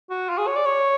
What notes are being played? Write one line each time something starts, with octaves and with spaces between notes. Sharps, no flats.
F#4
F4
G#4
C#5
D5
C#5